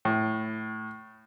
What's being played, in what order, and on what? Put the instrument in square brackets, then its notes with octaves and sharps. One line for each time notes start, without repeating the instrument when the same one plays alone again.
[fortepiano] A2